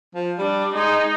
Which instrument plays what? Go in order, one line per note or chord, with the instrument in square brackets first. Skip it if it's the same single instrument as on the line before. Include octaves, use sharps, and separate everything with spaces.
[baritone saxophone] F3
[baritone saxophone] G3 [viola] D4
[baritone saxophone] G#3 [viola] D#4